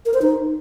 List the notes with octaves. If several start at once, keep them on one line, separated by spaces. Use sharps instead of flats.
A#4
C5
D#4